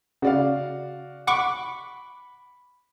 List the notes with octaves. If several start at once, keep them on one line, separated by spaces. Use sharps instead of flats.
C#3 F#4 D5 F5
F#5 B5 C#6 D6